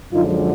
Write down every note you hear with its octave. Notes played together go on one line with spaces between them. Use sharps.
F#2 D3 F3 G#3 D#4 F4